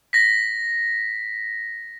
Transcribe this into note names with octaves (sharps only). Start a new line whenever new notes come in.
A#6 B6